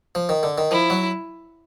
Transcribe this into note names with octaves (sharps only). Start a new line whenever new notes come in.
F3
D#3
D3
D#3
F3 E4
F#3